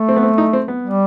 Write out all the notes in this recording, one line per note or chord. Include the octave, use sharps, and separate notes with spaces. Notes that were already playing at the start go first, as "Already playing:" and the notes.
Already playing: A3
C4
B3
C4
D#4
C4
B3
G3